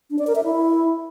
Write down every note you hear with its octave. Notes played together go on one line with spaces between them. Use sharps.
D4
D5
A#4
E5
E4